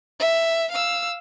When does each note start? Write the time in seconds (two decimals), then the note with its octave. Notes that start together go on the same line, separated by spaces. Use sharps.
0.20 E5
0.71 F5 E6